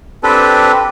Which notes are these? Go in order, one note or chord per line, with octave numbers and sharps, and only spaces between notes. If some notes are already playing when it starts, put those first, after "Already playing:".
C4 D4 G4 A4 B4